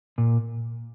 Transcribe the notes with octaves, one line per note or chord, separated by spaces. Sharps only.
A#2